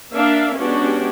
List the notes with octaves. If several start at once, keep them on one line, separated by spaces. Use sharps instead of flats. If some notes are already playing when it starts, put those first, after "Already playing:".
A#3 D4 A#4 E5 F5
G#3 B3 C#4 D4 F#4 G4